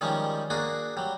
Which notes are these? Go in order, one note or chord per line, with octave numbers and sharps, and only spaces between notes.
D#3 F3 G3 G#3 C#4
A#3 D4 F#4 G#4
F#3 G3